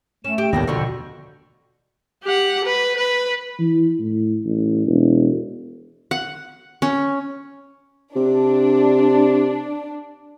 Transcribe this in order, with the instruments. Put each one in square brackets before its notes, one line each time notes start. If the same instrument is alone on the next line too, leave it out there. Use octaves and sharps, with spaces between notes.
[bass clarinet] A3 [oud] C#4 [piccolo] E7
[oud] G4 [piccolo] D7
[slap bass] D#2 A2 [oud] G3 A#3 D4 [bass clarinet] B3 [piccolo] A#6
[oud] F2 F3 [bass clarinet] B2 [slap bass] D3 [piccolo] C#6
[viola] G4 F#5
B4
B4
[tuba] E3
A2
A1
E1
[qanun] F#5
C#4
[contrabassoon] C3 [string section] D4